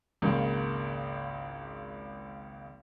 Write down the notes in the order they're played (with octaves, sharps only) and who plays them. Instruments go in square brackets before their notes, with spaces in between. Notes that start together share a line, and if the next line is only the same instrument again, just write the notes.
[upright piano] G#1 C#2 C#3 A#3